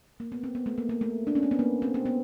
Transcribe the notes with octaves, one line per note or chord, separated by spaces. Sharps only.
A#3
B3
C4
B3
A3
A#3
A#3
A3
D4
C#4
C4
B3
A#3
C4
C4
B3